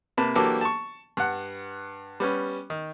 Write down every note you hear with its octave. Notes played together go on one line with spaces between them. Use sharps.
C3 A#3 B4 A5
E3 F#3 A#3 D4 G4 A4
A5 C#6
G2 F#5
G3 B3 C#4
D#3